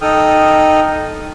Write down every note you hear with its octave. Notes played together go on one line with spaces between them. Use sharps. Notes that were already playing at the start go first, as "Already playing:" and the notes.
D#4 A4 G5 D#6 F6